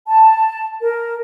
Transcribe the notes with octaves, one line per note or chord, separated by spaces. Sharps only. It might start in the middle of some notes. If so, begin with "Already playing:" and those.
A5
A#4